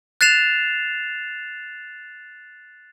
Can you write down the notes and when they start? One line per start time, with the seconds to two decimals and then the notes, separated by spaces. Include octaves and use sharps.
0.21 F#6 A6 C7 E7 F7